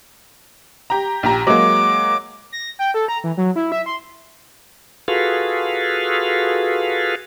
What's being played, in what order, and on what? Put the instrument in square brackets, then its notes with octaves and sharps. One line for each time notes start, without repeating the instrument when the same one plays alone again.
[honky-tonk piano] G4 A#5
A#1 G4 A#5
[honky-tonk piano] F#3 G#3 A#3 [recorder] D6
[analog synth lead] A#6
G5
A4
A#5
E3
F#3
E4
E5
C6
[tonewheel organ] F4 F#4 G#4 A4 B4 F5